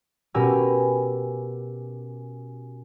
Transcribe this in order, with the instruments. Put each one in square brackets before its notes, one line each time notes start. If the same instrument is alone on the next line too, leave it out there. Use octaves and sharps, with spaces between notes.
[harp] B2 C#4 G4 A#4 G#5 E6